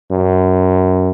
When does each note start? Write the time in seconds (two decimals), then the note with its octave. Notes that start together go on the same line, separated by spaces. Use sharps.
0.12 F#2